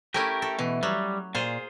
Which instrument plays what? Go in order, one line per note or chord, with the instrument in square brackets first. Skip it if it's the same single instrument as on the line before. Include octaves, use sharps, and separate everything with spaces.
[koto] A3 C#4 E4 [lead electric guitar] G4 A#4
[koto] A4
[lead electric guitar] B2 [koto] E3
[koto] F#3 [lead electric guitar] G3
[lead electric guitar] A#2 [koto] F4 G#4 C5